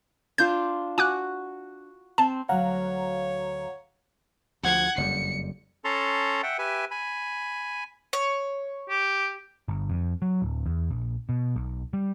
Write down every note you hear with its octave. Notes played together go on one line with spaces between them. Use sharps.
D4 F4 C5 G6
F#4 G#5 D6 F#6
C4 A5
D2 F#3 C#5 F5 F#5 A#5
D2 F3 F#5 G#6
F#1 F2 G3 C#7
C#4 A4 A5 A#5 C6
E5 F#5 G5
G4 B4 E5 G#5
G#5 B5
C#5
G4
G1
F2
F#3
D1
E2
A#1
B2
B1
G3